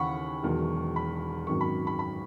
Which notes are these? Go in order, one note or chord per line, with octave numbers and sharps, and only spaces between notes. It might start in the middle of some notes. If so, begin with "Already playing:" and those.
Already playing: D#2 C#3 E3 F#5 B5 C#6
E1 E2 D#3 F#3
B5
G#1 F#2 D#3 F#3 C#6
B5
B5
B5